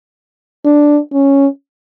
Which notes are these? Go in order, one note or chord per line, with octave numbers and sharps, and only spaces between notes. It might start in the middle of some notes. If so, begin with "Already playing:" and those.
D4
C#4